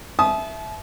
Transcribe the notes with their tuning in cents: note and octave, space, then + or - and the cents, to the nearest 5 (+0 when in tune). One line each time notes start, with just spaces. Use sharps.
E5 +0 A5 -40 D#6 +0